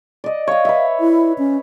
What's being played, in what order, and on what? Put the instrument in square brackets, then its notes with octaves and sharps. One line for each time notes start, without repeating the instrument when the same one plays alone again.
[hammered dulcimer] D5 D#5
[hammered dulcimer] C#5 D#5 [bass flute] F5
[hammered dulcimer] B4 E5
[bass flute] E4
C#4